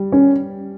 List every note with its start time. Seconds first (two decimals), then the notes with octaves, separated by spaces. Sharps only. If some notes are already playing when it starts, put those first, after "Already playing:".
Already playing: G3
0.12 C#4